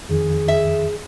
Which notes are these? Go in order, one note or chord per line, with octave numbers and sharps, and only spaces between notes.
F2 D#3 G#4
E5